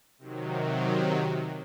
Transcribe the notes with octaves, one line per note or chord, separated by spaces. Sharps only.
C3 D#3 F#3